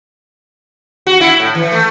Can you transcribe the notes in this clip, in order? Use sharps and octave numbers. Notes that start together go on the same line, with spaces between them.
F#4
E4
A2
E3
A3